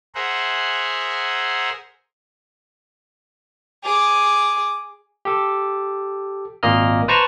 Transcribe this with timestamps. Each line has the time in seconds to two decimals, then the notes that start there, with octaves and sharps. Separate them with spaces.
0.15 G#4 A#4 C5 E5 F#5
3.84 G#4 D6
5.25 G4 A4
6.63 G#1 A#2 A#3 D#5 A#5 F6
7.08 B4 C5 A5 A#5 C#6